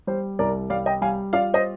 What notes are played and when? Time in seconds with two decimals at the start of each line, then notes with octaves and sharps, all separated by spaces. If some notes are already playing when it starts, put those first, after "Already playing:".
0.07 G3 C5
0.39 C2 A#4 D5
0.70 G3 D5 F5
0.86 D#5 G5
1.01 G3 F5 G#5
1.33 F4 D5 F5
1.54 C5 D#5